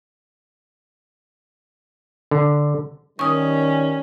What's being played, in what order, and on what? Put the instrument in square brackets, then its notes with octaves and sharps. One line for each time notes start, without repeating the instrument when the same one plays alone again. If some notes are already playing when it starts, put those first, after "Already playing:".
[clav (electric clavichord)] D3
[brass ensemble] D#3 G3 [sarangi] C#4 [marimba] C#6 D#6